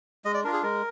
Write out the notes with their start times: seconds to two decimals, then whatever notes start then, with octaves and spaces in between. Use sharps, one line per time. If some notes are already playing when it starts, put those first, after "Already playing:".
0.25 G#3 D#5
0.34 D5
0.44 D4 A#4
0.47 F4
0.53 G#4
0.63 G#3 A#4